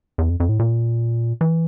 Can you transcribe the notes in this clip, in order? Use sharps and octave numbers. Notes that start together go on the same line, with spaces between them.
E2
F2
F2
A2
A#2
E3